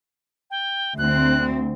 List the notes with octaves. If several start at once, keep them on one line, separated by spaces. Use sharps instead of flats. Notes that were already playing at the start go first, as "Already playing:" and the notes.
G5
D2 C4 F#6